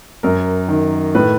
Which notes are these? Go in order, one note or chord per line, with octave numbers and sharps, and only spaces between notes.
F#2 A#4
D#3
A2 B4